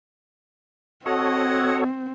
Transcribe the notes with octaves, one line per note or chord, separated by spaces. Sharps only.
C4 F#4 A4 C#5 D#5 F#5